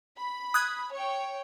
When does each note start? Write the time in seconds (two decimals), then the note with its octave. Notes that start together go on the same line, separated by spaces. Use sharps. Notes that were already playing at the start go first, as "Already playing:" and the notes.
0.17 B5
0.54 D#6 F#6 G#6
0.93 C#5 G5